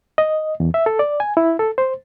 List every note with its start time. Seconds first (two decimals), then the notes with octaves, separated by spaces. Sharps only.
0.18 D#5
0.60 E2
0.74 E5
0.86 A4
0.99 D5
1.20 G#5
1.37 E4
1.59 A4
1.78 C5